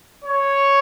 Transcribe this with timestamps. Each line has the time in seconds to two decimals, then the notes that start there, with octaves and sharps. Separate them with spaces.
0.25 C#5